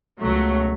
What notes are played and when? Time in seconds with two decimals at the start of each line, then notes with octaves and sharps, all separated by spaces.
0.21 C#2 B2 F#3 A3